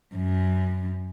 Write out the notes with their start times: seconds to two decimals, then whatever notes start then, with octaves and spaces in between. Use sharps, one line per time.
0.15 F#2